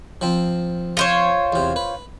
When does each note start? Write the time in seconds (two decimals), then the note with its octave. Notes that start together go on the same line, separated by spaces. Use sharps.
0.21 F3 C4
0.97 F4 C5 C#5
1.52 E2 C3
1.76 B4